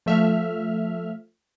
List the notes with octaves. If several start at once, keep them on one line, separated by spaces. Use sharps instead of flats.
F3 A3 E5 F6